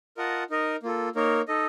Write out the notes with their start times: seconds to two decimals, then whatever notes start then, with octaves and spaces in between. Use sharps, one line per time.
0.17 F4 A#4 D#5 F#5 A5
0.50 D#4 A#4 D#5
0.83 A#3 F4 A4
1.15 A#3 D#4 A#4 C#5
1.48 D#4 A4 D#5